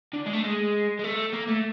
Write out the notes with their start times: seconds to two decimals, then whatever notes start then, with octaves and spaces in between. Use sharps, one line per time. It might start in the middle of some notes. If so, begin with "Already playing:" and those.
0.13 D3
0.26 G#3
0.33 A3
0.44 G#3
0.99 G#3
1.04 A3
1.33 A#3
1.48 A3